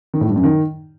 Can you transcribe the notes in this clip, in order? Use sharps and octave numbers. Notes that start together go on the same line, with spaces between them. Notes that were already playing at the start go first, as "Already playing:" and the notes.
D#3
A2
G2
F#2
D#3